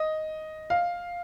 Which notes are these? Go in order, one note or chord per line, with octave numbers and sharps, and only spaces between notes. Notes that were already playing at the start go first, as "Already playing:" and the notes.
Already playing: D#5
F5